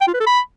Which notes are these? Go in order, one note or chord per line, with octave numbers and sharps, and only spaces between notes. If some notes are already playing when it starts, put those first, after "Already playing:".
G5
F4
B4
A4
B5